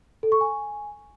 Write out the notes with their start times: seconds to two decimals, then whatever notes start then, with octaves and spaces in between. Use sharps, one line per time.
0.23 A4
0.32 C#6
0.41 G#5